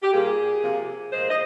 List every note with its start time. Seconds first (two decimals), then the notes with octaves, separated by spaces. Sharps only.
0.02 G4
0.12 A#2 G3 A#3 G#4
0.62 C3 F3 A#3
1.11 A#2 F3 G#3 C5
1.30 D#5